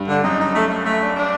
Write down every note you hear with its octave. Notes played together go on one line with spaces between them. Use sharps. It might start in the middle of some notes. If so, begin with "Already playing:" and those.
Already playing: G2
D3
F#2 D#4
D#4
A3
A3
A3
D4
D4